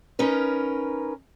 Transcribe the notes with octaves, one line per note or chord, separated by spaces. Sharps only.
C#4 D#4 A#4 B4